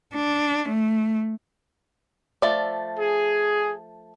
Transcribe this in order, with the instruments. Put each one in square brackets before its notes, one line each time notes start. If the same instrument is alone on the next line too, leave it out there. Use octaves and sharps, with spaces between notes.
[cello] D4
A3
[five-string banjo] F3 A3 D5
[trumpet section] G#4